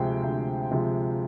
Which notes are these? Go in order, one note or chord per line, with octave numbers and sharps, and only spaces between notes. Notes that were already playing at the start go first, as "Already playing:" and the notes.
Already playing: D2 C3 F3 G#3 C5 G5
D2
C3 F3 G#3